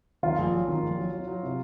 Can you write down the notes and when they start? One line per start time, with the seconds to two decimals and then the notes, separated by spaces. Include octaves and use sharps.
0.23 D#3 F4
0.38 A#1
0.53 F#3
0.68 D#3
0.82 A#1
0.98 F#3
1.13 F#3
1.27 F#3
1.43 C3